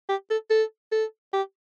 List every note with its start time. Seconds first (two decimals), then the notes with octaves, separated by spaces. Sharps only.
0.09 G4
0.30 A4
0.50 A4
0.92 A4
1.33 G4